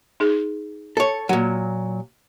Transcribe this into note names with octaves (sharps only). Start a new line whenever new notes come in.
D#4 G#4
A4 C#5
A#2 F#3 F#5